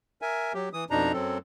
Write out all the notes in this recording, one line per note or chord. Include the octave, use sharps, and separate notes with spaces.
A#4 E5 G#5
F#3 G4
E3 D#6
F2 B2 D4 D#4 A#5
F#2 F#3 C4 A4